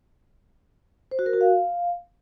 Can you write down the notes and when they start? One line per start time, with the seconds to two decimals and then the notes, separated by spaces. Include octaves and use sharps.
1.11 C5
1.19 F#4
1.26 A#4
1.33 F#4
1.41 F5